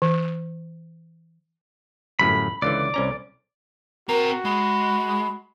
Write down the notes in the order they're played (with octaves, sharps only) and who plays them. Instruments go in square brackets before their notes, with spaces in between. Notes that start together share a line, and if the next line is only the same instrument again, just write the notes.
[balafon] E3
[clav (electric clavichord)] G1 F#2 A2 [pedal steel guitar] B5
[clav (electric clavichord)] C#2 D3 E3 [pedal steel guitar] D5
[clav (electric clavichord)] C2 C#4 A#5
[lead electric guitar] C4 A#5 [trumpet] F#4 [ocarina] A#4
[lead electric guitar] G#3 [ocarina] B5